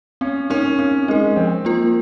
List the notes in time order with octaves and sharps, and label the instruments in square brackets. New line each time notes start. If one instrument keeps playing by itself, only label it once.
[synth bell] C4 [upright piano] C#4
[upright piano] C#4 [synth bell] D#4 A#4
[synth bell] C4 [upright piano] C#4
[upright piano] G#3 [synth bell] D#4 A#4
[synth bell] F3 [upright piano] C4
[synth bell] A#3 F4 A#4